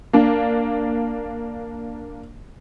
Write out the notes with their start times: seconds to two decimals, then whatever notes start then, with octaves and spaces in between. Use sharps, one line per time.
0.13 A#3 D4